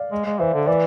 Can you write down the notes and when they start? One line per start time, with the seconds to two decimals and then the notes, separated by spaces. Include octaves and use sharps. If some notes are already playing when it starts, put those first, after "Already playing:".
Already playing: D5 F5
0.12 G#3
0.26 G#3
0.40 E3 C5 E5
0.53 D3
0.67 E3 B4 D5